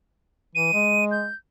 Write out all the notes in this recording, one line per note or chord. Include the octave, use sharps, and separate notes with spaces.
E3 D#7
G#3
G6